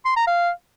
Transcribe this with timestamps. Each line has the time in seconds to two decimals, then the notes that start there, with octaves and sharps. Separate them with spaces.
0.05 C6
0.16 A#5
0.27 F5